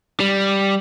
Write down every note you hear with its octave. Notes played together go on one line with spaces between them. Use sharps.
G3